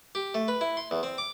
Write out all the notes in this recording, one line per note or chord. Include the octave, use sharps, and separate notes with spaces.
G4
A3
B4
E4
C6
E2
C4
D6